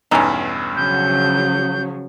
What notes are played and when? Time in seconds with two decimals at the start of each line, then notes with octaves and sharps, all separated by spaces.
0.11 B1 E2 G2 C#4 D#4
0.76 C#3 F3 F#3 G6